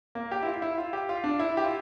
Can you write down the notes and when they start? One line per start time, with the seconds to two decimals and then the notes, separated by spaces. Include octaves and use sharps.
0.15 A#3
0.31 G4
0.43 E4
0.46 F4
0.62 E4
0.78 F4
0.93 G4
1.09 F4
1.24 D4
1.39 E4
1.57 G4
1.64 F4